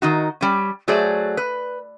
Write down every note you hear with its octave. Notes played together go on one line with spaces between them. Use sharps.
D#3 D#4 F#4
G3 C#4
F#3 A3 F#4 G#4 C5 D5
B4